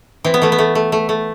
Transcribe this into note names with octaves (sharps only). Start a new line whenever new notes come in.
E3 C4
B3
E3 A3
B3
A3
A3
A3
A3